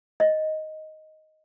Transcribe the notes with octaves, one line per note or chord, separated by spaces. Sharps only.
D#5